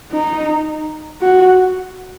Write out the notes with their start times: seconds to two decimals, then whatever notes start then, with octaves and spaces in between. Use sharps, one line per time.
0.12 D#4
1.21 F#4